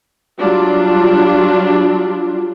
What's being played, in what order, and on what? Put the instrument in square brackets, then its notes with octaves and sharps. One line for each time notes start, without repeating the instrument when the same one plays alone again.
[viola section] F#3 G3 D4 F4